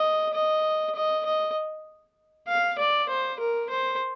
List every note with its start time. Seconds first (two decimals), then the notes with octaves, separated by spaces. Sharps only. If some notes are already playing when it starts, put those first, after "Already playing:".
Already playing: D#5
0.34 D#5
0.95 D#5
1.25 D#5
2.48 F5
2.79 D5
3.09 C5
3.39 A#4
3.70 C5